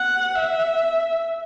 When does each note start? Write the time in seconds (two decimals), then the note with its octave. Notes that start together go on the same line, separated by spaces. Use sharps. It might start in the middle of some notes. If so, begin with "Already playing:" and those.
Already playing: F#5
0.34 E5